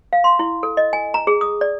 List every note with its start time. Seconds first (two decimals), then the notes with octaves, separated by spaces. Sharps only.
0.13 F5
0.24 C6
0.39 E4
0.63 A4
0.77 D#5
0.93 G#5
1.14 A#5
1.27 G#4
1.41 D#6
1.61 D5